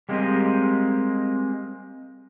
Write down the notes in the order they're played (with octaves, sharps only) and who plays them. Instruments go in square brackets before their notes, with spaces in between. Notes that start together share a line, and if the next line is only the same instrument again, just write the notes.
[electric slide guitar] G3 G#3 A#3 C4 G4 D#5